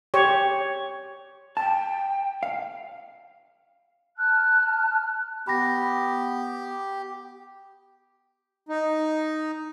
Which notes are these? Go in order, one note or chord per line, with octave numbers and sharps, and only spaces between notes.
G4 C#5
G5 A5
F5
A5 F6 F#6
B3 G4 B5 A#6
D#4